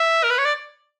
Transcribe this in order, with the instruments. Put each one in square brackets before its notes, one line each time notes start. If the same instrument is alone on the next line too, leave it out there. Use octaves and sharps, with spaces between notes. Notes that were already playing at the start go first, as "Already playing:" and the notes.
Already playing: [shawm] E5
A#4
B4
C#5
D5